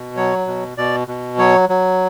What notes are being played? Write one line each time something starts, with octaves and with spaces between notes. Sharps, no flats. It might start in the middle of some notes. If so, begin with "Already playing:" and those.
Already playing: B2
F#3 C#5
B2
B2 D5
B2
F#3 C#5
F#3